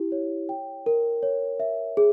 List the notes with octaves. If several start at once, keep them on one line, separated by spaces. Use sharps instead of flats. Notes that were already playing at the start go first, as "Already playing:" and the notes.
Already playing: E4 G4
C#5
G5
A#4
C#5
E5
G#4